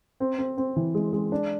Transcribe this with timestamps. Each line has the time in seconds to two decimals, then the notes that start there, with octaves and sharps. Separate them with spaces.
0.20 C4
0.38 C4
0.58 C4
0.76 E3
0.95 G#3
1.13 G#3
1.32 D4